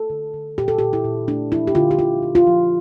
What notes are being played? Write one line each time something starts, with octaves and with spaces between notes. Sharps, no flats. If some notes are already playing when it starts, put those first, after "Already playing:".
Already playing: A4
D3
D3
A#2 G4
A4
A#2 G4
E4
A#2
A3 D4
F3 E4
G4
D3 F4
G4
D3 F4
D3
F4
F3